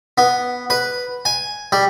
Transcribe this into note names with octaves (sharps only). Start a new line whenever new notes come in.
B3
B4
G#5
G3